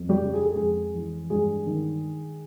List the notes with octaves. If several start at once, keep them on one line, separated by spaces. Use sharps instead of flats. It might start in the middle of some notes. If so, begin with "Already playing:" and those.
Already playing: F2
G3 G4
C#3
G#4
A4
F2 G#3 G#4
E3
G2 G#3 G#4
D#3